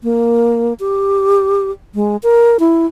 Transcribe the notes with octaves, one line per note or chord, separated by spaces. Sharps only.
A#3
G4
G#3
A#4
E4